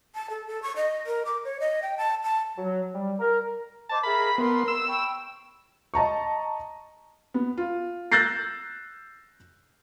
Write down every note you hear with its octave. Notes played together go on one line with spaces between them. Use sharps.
A5
A4
A4
C#6
D#5
A#4
D6
C#5
D#5
G5
A5
A5
F#3
G3
A#4
C5 D#5 A5 D6
G#4 A#4 E5 B5
B3 A#4 B5 C6
E6
G5 B5 C#6
D#5 A5 A#5 C#6
B3
F4
E6 F#6 G6 A6 A#6 C7